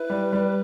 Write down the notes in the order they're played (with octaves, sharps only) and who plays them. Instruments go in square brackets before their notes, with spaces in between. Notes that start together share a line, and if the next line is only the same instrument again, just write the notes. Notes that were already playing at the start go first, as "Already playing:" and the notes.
Already playing: [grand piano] E4 [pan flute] B4
[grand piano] G3
G3